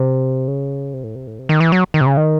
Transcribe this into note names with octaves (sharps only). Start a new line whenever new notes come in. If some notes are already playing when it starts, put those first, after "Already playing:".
Already playing: C3
C#3
C3
A2
C3
A2
C3
D#3
E3
F#3
D#3
C3
C#3
D#3